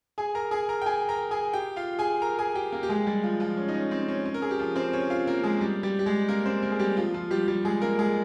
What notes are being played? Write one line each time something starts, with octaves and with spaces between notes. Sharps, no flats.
G#4 G#5
A#4 A#5
G#4 G#5
A#4 A#5
G5
G#4 G#5
A#4 A#5
G#4 G#5
G4 G5
F4 F5
G#4 G#5
A#4 A#5
G#4 G#5
G4 G5
A#3 A#4
G4
G#3 G#4
G3 G4
F3 F4
F3 F4
C#4
D#4
C#4
C4
C#4
C#4
A#4
G#4
G4
F3 F4
C4 C5
C#4 C#5
F4 F5
A#3 A#4
G#3 G#4
G3 G4
G3 G4
G4
G#3 G#4
A#3 A#4
C4 C5
A#3 A#4
G#4
G3 G4
F3 F4
F3 F4
G3 G4
G3 G4
G#3 G#4
A#3 A#4
G#3 G#4